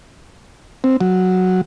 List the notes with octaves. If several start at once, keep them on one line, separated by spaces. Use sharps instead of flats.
C4
F#3